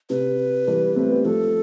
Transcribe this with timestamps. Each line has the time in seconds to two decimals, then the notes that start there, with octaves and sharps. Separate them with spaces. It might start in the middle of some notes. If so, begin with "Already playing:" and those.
0.10 C3 B4
0.67 E3 G3
0.96 A3 C4
1.11 G3 B3
1.25 F3 A3 A4